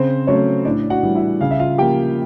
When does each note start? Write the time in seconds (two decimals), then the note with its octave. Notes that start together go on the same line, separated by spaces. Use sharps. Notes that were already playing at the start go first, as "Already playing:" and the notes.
Already playing: C#3 C4 C5
0.27 F#3 A3 C#4 C#5
0.65 A2 D4 D5
0.90 F#4 F#5
1.03 E3 G3
1.15 E4 E5
1.41 C#3 F5
1.51 E5
1.59 F4 F5
1.78 F3 A#3 G4 G5